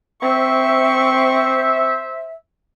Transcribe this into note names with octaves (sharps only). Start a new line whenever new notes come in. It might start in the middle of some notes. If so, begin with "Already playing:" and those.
C4 C5 E5 C#6